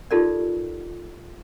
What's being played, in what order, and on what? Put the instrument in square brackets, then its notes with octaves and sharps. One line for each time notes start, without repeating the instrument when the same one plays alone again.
[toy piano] D#4 F4 G4 A4 A#4 D5